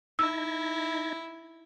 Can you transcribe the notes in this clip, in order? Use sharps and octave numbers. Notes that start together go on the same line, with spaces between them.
D#4 E4 A#5 E6 G#6